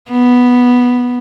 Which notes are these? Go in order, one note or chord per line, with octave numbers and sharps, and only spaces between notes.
B3